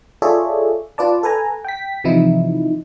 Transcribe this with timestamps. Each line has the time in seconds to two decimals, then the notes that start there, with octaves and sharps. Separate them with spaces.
0.22 F4 G#4 A4 C#5 D5 E5
0.98 F4 B4 D5 A5
1.23 A4 B4 G#5 A#5
1.64 G5 B6
2.04 C3 E3 F3 D#4 E4